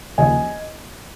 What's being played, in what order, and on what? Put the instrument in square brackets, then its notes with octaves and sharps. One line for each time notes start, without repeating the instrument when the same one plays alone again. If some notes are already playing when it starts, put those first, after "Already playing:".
[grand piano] D#2 C#3 F3 D#5 G#5